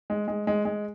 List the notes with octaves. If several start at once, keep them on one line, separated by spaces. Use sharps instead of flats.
G#3
G#3
G#3
G#3